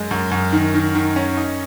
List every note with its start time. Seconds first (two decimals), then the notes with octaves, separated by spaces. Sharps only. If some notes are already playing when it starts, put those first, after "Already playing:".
Already playing: F#2 G#3
0.11 F#2
0.31 F#2
0.53 D#3
0.75 D#3
0.95 D#3
1.16 C#4
1.37 D#4